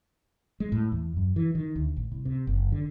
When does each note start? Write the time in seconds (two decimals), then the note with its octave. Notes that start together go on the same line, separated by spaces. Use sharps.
0.60 G#3
0.72 A2
0.92 E2
1.17 F#2
1.36 E3
1.55 D#3
1.76 D2
1.97 A1
2.12 C2
2.25 C3
2.47 F#1
2.72 D3